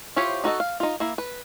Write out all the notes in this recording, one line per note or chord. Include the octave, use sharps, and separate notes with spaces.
E4 F4 G4 C5 C#5
D#4 F#4 A4 D#5
F5
D#4 F4
A#3 E4
B4